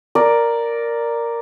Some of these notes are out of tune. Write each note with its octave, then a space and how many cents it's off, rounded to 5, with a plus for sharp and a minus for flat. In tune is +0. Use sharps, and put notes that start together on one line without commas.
A#4 +0 D5 +0